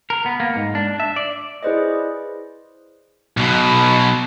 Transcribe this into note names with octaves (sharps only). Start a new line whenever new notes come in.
A#4
B3
A#3
G#2
D4
E5
D5
E4 G#4 B4 C5 D5 D#5
B1 B2